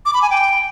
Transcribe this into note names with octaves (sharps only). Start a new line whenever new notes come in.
D6
B5
G#5
G5